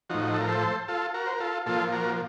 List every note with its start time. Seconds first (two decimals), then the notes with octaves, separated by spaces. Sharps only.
0.10 A2 F3 D#4 F#4
0.33 A4
0.41 A#4
0.48 A4 C5
0.88 F4 A4
1.14 F#4 A#4
1.26 C5
1.33 A#4
1.40 F4 A4
1.66 A#2 F3 F4 A4
1.92 F#4 A#4